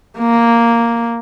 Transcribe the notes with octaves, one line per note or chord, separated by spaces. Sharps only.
A#3